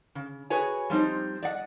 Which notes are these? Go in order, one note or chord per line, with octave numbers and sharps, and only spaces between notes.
C#3
F#4 G#4 B4 C#5 G#5
F3 G3 C4 D#4 C5
D5 D#5 F#5